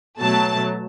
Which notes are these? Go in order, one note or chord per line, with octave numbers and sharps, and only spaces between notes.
B2 F#3 A3 A5